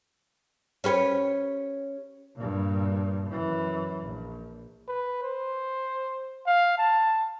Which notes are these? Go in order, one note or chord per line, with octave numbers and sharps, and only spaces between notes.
C#4 G4 B4
G2 A#2
F#2 E3
A#1
B4
C5
F5
A5